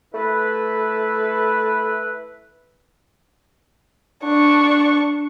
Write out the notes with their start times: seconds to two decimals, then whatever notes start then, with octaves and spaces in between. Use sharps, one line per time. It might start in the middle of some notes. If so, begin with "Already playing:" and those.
0.13 A3 E4 B4
4.25 D4 C#6